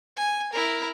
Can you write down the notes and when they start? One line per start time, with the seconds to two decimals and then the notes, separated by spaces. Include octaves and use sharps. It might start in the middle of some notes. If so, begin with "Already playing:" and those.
0.17 G#5
0.53 E4 A#4